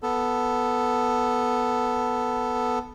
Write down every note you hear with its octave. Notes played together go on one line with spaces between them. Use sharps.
B3 A4